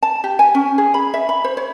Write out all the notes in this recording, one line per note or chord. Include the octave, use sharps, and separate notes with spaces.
A5
G4
G#5
C#4
G#4
B5
E5
B5
C5
C#5